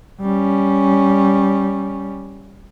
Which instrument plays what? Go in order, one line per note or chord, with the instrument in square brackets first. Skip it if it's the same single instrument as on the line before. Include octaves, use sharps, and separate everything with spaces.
[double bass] G3 C#4